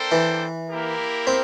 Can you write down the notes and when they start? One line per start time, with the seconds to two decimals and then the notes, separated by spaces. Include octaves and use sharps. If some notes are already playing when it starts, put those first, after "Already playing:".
Already playing: A#3 D4 A4 C5 G5
0.12 E3
0.69 A#3 E4 G4 A#4
1.27 C4